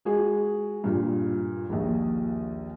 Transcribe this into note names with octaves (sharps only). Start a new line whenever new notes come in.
G#3 F#4 G#4
G2 A#2
A#1 D#2